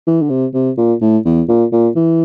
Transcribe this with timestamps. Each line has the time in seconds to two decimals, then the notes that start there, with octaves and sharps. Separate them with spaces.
0.07 E3
0.22 D3
0.30 C3
0.54 C3
0.78 A#2
1.01 A2
1.25 E2
1.48 A#2
1.72 A#2
1.96 E3